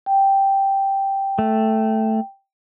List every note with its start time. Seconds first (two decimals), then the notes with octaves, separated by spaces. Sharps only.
0.06 G5
1.39 A3